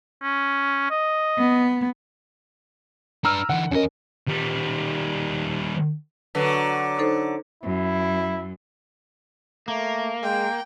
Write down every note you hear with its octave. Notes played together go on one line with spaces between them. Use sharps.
C#4
D#5
B3
D4 B4 A#5 E6 F6
D3 E3 F#5
E2 C#4 A#4 D#5
D#3 G3
D3 F#3 B4
D#4 A4 C5
F#2 E4
A3 A#3
G#3 G5